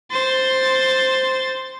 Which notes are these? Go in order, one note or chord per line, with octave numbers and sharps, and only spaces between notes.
C5 A6